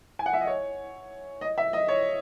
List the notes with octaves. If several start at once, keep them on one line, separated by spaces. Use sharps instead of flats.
G#5
F#5
E5
D#5
C#5
D#5
E5
D#5
C#5